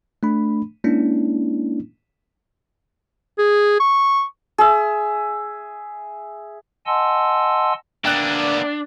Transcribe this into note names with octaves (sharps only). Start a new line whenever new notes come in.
A3 D4 B5
G#3 A#3 C#4 D4 E4
G#4
C#6
G#4 E5
D#5 F#5 G#5 A5 C6 E6
A#3 B3 D4 D5 E5 G5 F#6 A6